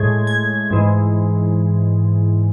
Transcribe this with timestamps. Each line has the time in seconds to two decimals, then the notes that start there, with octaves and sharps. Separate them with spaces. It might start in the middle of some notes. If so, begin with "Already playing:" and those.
Already playing: A2 G#3 G#6
0.27 G#6
0.71 G#2 E3 G#3